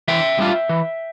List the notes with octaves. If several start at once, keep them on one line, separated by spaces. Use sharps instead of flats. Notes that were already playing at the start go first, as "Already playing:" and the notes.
E3 E5 G5
G3 D4 F4
E3